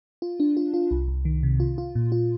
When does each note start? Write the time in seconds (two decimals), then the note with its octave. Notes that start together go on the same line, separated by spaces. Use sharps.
0.22 F4
0.40 D4
0.57 F4
0.74 F4
0.91 C2
1.08 C2
1.25 D#3
1.43 C3
1.60 F4
1.78 F4
1.95 A#2
2.12 F4